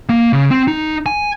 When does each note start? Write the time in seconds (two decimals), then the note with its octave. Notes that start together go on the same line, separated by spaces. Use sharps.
0.09 A#3
0.33 C#3
0.51 C4
0.68 D#4
1.06 G#5